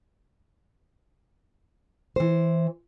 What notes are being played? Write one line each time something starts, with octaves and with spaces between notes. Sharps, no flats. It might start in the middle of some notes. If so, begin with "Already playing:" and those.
E3 C5